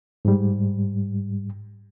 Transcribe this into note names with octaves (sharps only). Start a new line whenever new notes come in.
G#2 G3